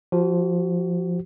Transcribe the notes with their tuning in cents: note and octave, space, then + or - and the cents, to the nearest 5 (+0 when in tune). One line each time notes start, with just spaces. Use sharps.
F3 +0 F#4 +40